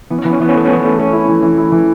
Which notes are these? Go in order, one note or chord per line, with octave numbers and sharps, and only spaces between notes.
E3 B3
C#4
E3 B3
C#4
E3 B3
C#4
A3 B3
C#4
E3 B3
A3
A3 C#4
E4
E3
E3
E4
E3